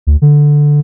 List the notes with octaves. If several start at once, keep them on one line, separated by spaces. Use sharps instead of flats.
D2
D3